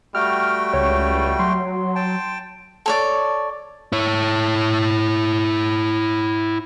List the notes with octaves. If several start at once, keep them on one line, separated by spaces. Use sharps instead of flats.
G3 A3 F#4 G5 F6
C#2 C#5
F#3 C6
G5 A5
A4 C#5 D5
E4 C#5